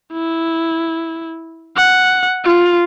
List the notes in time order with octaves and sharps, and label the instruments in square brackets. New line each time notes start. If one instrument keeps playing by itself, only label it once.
[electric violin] E4
F#5
F4